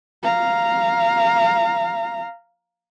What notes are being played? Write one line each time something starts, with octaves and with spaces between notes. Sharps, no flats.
F5 A#5